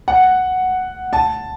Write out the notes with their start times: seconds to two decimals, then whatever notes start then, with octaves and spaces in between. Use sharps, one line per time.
0.08 F#5
1.13 A5